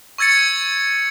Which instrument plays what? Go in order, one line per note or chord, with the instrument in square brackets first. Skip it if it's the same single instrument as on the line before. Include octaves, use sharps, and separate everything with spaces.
[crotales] C#6 E6 G#6 A6 C#7